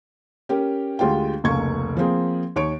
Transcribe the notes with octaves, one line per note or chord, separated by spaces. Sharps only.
C#4 G4 A#4
D2 G#3 F4 G4 G5
F1 C#2 A#3 C#6 G#6
F3 A#3 C4 G#4
D#2 C#5 C#6 D7